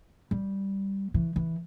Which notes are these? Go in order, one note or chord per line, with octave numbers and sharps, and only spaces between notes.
G3
E3
E3